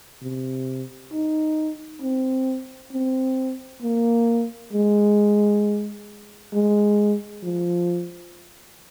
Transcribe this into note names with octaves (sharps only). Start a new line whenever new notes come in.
C3
D#4
C4
C4
A#3
G#3
G#3
F3